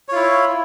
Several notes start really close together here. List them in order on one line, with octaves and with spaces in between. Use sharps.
C#5 F4 E4